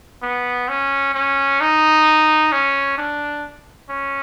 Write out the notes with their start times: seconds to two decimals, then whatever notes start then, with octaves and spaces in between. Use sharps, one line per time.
0.23 B3
0.69 C#4
1.15 C#4
1.61 D#4
2.52 C#4
2.98 D4
3.89 C#4